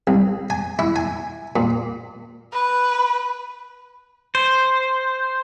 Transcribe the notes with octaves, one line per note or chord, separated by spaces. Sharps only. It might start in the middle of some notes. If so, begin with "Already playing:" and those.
C2
G#5
E4
G#5
A#2
B4
C5